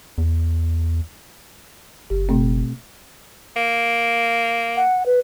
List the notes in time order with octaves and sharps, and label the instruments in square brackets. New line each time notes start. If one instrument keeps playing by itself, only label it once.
[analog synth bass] E2
[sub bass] F#1 [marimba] G4
[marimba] B2 A3 C4
[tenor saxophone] A#3
[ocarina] F#5
B4